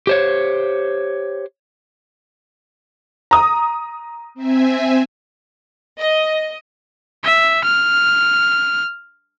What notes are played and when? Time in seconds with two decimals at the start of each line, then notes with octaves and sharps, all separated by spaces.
0.07 G4 C5 C#5
3.31 A#5 D#6
4.34 C4 E5 G#5
6.00 D#5
7.24 E5
7.64 F6